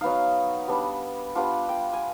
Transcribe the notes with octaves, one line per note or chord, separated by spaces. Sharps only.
F#3 B3 D#4 F5
G3 B3 D4
G3 B3 D4 F4 F#5
G5
G#5